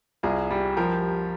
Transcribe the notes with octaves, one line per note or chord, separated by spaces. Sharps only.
C2 F4 G#4
G3
F3 G4 A#4